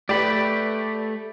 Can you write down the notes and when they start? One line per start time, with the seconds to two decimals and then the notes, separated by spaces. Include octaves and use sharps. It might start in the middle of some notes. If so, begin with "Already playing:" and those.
0.09 A3 G4 B4 D5 B5